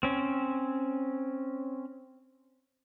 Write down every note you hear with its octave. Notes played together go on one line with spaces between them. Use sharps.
C4 C#4